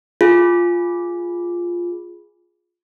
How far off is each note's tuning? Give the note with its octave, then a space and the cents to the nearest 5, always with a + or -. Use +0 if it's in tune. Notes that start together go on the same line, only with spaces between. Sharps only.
F4 +0 G#4 +0